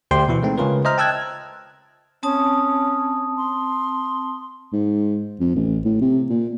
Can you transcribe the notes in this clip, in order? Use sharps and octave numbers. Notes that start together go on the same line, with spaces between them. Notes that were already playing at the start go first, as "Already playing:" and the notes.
D2 G4 C5 G5 C6
B2 E3 E4
G#3 A3 C4 D#4
C#3 G#3 C#4 F4 A#4 B4
C5 D#5 E5 A#5 F6
G5 A5 E6 F#6 G#6
C4 C#4 A5 D#6
C6
G#2
F2
A1
A2
C3
A#2